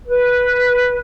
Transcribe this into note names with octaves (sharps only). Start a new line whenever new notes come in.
B4